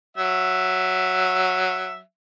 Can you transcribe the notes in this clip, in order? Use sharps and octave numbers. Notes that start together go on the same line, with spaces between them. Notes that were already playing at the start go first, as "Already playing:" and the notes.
F#3 E5